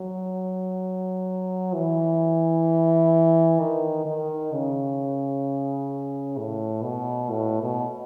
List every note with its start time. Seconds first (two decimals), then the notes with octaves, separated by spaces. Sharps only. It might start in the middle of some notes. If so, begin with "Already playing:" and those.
Already playing: F#3
1.74 E3
3.60 D#3
4.06 D#3
4.53 C#3
6.38 A2
6.83 B2
7.30 A2
7.61 B2